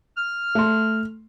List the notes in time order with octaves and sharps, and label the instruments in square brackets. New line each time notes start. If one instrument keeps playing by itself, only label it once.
[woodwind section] F6
[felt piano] A3 C6